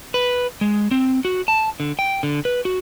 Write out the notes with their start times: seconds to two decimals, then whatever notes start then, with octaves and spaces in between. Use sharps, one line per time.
0.14 B4
0.61 G#3
0.91 C4
1.25 F#4
1.48 A5
1.80 D3
1.99 G5
2.23 D3
2.45 B4
2.65 F#4